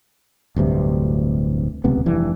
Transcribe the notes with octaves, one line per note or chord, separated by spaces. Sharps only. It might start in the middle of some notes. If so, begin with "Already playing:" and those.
D1 D2 G2 C3
D#1 C#2 C3 B3
F1 G2 E3